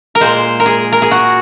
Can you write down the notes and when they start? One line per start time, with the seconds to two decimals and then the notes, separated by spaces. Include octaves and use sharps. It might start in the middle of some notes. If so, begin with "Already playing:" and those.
0.15 A#4
0.21 A#2 G#3 C5
0.60 A#4
0.66 G#4
0.92 A#4
1.02 G#4
1.11 F#4